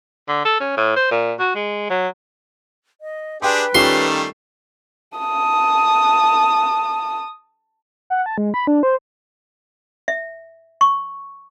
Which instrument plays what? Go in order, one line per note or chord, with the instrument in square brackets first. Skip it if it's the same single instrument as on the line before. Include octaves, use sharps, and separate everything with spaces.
[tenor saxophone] D3
A4
C#4
A2
C5
A#2
F#4
G#3
F#3
[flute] D#5
[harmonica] D4 G4 G#4 [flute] B4 [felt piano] G5 C6
[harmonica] D#3 G3 A3 [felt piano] C#4 F4 G4 [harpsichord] C6
[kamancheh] A5 D#6
[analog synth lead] F#5
A5
G#3
B5
D4
C5
[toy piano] E5
C#6